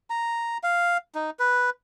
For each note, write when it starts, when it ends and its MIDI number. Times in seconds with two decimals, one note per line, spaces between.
0.10 0.58 82
0.63 0.97 77
1.15 1.30 63
1.39 1.70 71